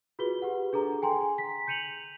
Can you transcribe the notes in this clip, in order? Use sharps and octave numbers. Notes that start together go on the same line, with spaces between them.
F4 F#4 G#4 B4 G7
G4 B4 F#5
D4 G#4 A4 A#5
G5 G#5 A#5 C6
B6
G6 C#7 D#7 F7 F#7